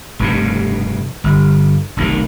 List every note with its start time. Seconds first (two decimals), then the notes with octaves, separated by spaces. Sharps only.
0.19 F1 G2 B2
1.24 G1
1.97 F1 B1 C3 D#3